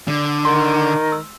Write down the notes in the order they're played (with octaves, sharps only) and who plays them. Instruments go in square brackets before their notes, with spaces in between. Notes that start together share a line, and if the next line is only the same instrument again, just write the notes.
[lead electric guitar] D3
[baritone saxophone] D#3 [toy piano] C6
[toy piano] E6